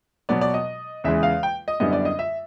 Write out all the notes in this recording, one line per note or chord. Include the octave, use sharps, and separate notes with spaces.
B2 F#3 B3 D5
D5
D#5
E2 C#3 E3 G#3 E5
F5
G5
D#5
F#2 D3 G3 B3 E4 D#5
D5
D#5
E5